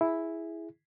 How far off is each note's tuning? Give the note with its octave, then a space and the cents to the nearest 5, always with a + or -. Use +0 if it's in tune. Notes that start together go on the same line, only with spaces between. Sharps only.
E4 +0 G#4 +0